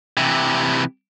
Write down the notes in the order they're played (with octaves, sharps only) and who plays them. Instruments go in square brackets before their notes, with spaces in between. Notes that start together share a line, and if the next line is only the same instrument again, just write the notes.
[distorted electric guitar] C3 E3